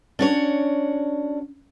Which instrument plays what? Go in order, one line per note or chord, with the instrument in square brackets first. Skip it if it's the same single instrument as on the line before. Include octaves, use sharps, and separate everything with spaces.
[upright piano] C#4 [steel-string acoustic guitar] D4 F#4 C#5